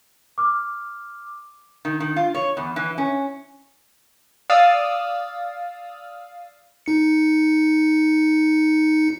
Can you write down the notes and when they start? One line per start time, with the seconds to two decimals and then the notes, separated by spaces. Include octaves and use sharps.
0.38 D6 F6
1.85 D#3
2.00 D#3
2.16 F4
2.34 C#5
2.57 E2
2.76 E3
2.98 C#4
4.50 D5 F5 D#6 E6
6.86 D#4 C#7